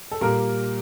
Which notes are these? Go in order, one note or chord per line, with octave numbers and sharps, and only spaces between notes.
A4
A#2 G3 A#3 A#4